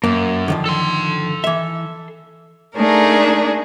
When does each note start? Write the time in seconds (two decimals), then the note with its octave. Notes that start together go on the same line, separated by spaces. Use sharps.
0.04 F#2 A#3
0.48 D3 D#3 F3
0.66 A4 C6
1.44 E3 E5
2.77 A3 D4 D#4 G#4 A#4